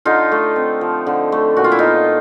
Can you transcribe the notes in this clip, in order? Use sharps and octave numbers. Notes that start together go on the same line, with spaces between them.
D3 D#4 F4
A3
C4
F3
D3
A3
A#2 F#4
F4
E4
B3 D#4 F4